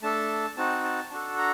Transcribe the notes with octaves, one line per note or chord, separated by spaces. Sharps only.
A3 D4 A4 A5
C4 D#4 F#4 A5
A5
D4 F#4 A4 A5
A#5